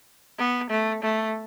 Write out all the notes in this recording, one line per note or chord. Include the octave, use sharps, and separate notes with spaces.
B3
A3
A3